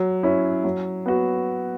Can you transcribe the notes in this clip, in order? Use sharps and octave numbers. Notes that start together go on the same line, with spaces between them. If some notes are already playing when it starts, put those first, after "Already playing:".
Already playing: F#3
C#4 E4
F#3
B3 F#4